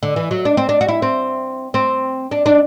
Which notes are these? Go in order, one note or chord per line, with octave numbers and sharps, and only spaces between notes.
D3
E3
F#3
D4
C4
D4
F#4
E4
C4
C4
D4
D4